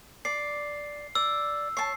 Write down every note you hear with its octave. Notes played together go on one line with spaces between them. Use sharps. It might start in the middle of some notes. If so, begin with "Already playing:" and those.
D5 C7
D5 E6
C#5 A5 C7